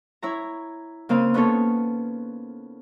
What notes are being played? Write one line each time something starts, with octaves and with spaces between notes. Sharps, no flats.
E4 C#5 A#5
C#3 A#3 C4 F5 D#6
B3 C#4 D#4 A4 C#5